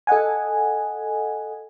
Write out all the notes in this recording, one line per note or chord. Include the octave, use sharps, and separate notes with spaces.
A4 D#5 F#5 G#5